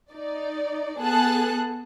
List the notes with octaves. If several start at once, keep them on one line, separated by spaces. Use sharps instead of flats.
D#4 D5
B3 G#4 A4 A5 F#6